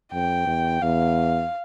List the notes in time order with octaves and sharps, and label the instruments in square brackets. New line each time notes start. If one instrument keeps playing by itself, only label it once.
[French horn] F2 [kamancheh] G5
[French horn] E2
[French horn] E2 [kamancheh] F5